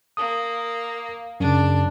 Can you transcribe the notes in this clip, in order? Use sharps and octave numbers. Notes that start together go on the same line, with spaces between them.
A#3 D#6
F#2 C#3 D4